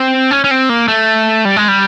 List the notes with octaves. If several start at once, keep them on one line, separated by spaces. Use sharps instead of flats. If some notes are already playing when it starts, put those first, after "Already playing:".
Already playing: C4
C#4
C#4
C4
A#3
A3
G3
G#3
G3